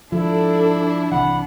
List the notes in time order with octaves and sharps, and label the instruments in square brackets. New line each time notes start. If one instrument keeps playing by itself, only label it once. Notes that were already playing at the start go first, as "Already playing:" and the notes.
[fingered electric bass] G#2 F3 [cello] D4 [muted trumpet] E4 [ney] A4
[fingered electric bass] C2 E3 [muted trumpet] F#5 [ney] B5